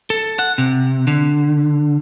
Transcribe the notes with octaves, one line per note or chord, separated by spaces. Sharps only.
A4
F#5
C3
D3